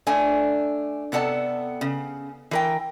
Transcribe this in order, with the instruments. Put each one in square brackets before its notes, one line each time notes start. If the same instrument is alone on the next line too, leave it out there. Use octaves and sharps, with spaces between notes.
[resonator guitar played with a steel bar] A3 D4 G#5
C3 B3 A4 D5 A5
C#3
E3 A#4 G5